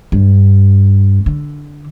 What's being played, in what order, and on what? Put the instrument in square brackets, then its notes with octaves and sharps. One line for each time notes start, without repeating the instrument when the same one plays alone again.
[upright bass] G2
D3